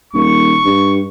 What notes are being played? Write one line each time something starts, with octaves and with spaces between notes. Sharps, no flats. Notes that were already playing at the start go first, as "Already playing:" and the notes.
D#1 C#6
G2